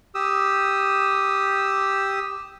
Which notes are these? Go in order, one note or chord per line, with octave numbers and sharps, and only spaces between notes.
G4 D#6 E6